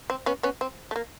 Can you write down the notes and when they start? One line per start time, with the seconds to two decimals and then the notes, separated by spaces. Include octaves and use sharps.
0.10 C4
0.26 B3 C#4
0.43 B3 C#4
0.61 C4
0.91 A3
0.96 A#3